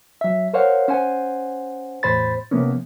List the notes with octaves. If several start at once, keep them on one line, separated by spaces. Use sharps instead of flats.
F#3 E5
A#4 C5 C#5 F5 F#5
C#4 C5 F#5 G#5
E2 A2 C5 B5 A6
C3 F3 A#3 B3 C#4